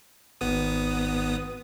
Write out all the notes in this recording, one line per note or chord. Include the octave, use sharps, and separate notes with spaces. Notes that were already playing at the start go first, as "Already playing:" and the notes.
G#1 B3 D#6